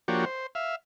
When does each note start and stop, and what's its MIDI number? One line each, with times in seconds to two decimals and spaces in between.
0.08 0.25 53
0.08 0.25 58
0.08 0.25 62
0.08 0.25 66
0.08 0.25 67
0.08 0.25 73
0.26 0.47 72
0.55 0.76 76
0.55 0.76 77